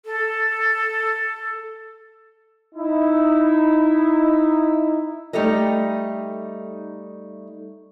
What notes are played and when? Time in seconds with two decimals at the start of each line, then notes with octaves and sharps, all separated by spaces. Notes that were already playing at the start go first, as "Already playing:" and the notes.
0.05 A4
2.75 D#4 E4
5.33 G3 A3 D#4 G4 A4 D#5